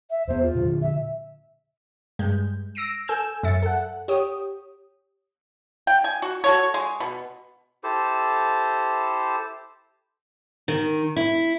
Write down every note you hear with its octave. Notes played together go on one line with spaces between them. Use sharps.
E5
E2 B3 C5
F4
A#2 D3
E5
G2 G#3 G6
E6 A#6 C7 D7 D#7
A4 G#5 E6 G6 G#6 E7
F#2 E5 A6 C#7
A4 F#5
G4 C#5 D#6
G5
G#5
F#4
F#4 A4 C#5
G#3
B2
E4 G4 A4 C5
D#3
E4